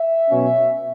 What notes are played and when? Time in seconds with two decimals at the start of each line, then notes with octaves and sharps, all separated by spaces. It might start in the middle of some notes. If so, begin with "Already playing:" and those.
Already playing: E5
0.29 B2 F#3 C#4